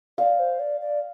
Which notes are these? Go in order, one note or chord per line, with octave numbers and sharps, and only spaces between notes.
D5 F5
C5
D5
D5